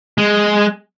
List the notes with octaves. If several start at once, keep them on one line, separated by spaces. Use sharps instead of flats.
G#3